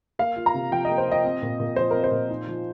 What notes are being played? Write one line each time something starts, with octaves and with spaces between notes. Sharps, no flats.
A#3 F5
F4
A#5
C3
F3 G5
A#3 D#5
C5
F4
D#5
C4
A#2
A#2
F3 C5
C4 A#4
C5
A#2
D#4
F3